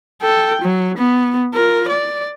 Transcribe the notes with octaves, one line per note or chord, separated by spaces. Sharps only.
A4 G5
F#3
B3
F4 A#4
D5